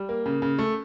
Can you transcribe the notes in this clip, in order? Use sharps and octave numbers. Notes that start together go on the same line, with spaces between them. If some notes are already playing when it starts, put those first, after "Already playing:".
Already playing: G3
A#3
C#3
C#3
A3